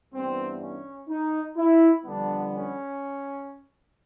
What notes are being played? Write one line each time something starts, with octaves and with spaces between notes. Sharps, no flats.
G2 E3 G3 B3 C4
C#4
D#4
E4
F2 D3 G3 B3 D4
C#4